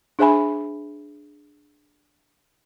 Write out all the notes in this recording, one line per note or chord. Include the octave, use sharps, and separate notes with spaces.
D4 G#4 C5 E5 G#5 B5